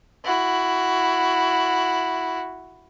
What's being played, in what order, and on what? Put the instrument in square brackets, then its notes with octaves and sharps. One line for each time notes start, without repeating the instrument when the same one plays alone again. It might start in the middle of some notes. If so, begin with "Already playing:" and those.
[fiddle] E4 F#4